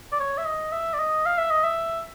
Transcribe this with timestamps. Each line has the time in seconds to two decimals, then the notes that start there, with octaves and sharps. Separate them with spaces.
0.12 D5
0.20 C#5
0.38 E5
0.45 D#5
0.72 E5
0.94 D5
0.99 D#5
1.26 F5
1.38 E5
1.50 D#5
1.64 E5